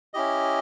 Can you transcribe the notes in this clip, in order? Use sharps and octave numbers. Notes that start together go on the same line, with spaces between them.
C#4 E4 G4 D#5